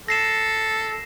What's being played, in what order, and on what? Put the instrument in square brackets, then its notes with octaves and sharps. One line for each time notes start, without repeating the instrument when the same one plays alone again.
[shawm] A4 [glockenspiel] A#6 C7 E7